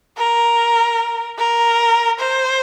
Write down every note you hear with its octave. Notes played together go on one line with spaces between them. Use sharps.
A#4
A#4
C5